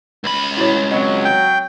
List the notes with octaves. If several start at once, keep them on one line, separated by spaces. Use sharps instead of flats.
C#2 B5
E4 F#4 C#5
F#3 C4 D#5
G5